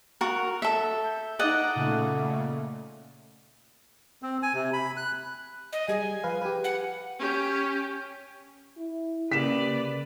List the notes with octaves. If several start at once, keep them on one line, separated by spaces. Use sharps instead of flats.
F#4 A#4
A4 E5
G6
D#4 D5 D#5 F#5 F#6 A#6
A#2 C#3 A3
C4
G#5
C3
B5
F#6
D#5
G3 G#4 G#5
F3 B4 F5
G4 B4
F#5
C#4 G4
E4
C#3 A#3 G4 B4 D5 B6 E7